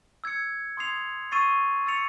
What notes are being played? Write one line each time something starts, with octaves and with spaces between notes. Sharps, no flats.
E6 G#6 C#7
C6 D#6 G#6 C7 F7
C#6 E6 A6 C7 D#7
E6 A6 C#7 F7